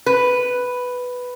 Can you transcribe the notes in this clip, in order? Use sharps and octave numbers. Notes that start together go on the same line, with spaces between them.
B4